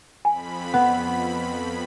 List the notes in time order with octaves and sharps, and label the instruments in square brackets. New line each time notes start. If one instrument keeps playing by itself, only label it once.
[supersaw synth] F2 B5 [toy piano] G#5
[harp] B3 [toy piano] F#5